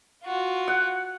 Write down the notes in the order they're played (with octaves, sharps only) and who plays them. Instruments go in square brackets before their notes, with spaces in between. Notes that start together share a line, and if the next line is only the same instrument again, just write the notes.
[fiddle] F4 F#4
[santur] F#5